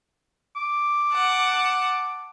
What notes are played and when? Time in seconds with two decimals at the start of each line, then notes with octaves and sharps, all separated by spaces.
0.56 D6
1.12 F#5 A5